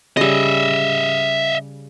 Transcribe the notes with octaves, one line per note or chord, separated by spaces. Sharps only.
C#3 G3 D#5 E5